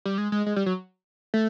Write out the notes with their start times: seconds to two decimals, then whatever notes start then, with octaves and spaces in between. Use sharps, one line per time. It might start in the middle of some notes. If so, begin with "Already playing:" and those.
0.06 G3
0.18 G#3
0.32 G#3
0.46 G#3
0.56 G3
0.66 F#3
1.34 A3